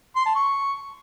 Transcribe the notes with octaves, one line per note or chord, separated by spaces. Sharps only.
C6
A5
C#6